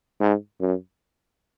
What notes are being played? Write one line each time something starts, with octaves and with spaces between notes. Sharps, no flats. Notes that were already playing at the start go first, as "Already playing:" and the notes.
G#2
F#2